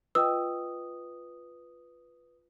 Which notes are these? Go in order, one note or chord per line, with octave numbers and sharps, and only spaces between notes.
F4 B4 D#5 G5 D#6 E6